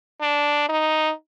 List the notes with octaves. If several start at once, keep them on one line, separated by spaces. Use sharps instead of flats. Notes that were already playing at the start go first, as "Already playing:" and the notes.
D4
D#4